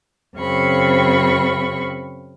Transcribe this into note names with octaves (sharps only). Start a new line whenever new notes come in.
F#2 C#3 C4 F5 B5 C#6